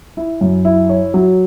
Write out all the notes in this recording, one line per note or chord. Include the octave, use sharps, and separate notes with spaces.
E4
F#2
E4
C#5
F#3